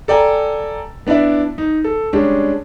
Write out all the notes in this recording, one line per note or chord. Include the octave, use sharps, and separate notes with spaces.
A4 D5 G5 G#5 A#5
B3 D4 E4 D5 E5
D#4
A4
G3 G#3 C#4 D4 G4